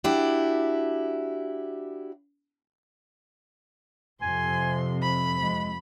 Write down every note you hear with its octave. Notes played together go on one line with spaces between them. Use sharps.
D4 E4 F#4 G4
F2 C3 G#5 C6
F3 B5
F2 G#3